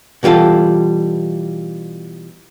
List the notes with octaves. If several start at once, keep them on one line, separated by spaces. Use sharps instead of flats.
B2 E3 G3 F4 A4